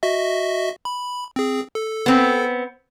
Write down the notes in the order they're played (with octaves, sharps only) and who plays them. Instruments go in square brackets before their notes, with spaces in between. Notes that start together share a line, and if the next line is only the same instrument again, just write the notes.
[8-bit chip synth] F#4 D#5 E5
B5
C4 G#4
A4
[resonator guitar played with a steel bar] B3 C4